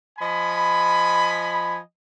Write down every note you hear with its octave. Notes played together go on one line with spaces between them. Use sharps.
F3 D#5 G#5 B5